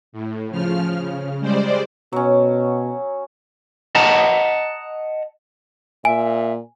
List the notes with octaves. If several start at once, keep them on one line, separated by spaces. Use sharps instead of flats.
A2
C#3 F3 F6
C#3
G3 G#3 C5 D5
B2 F#3 C#4
D#5 F#5 A5 A#5
A#2 E5 G#5